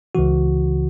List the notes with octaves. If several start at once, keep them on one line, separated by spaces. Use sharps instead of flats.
C#2 C#3 E3 F#4